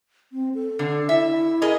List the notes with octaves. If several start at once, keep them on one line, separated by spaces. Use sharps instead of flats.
C4
A4
D3
E4 E5
G#4 A#4 D#5